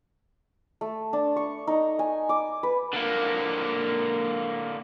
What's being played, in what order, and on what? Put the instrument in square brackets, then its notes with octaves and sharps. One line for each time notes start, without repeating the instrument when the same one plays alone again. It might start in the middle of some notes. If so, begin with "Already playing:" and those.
[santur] A3
D4
C#6
D#4
G#5
D6
B4
[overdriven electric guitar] D3 A#3